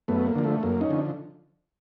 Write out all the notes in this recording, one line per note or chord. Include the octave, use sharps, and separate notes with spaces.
F#2 A3 B3
A#3
D3 F3
A3
F#2 A#3
C#4 D#4
D3 F3